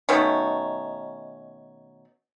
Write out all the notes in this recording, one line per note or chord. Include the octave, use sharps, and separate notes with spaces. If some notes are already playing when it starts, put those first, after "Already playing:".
B2 D#3 A3 C#4